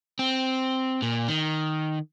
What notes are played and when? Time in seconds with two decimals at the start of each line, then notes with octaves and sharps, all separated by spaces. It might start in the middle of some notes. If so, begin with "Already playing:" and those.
0.19 C4
1.02 A#2
1.28 D#3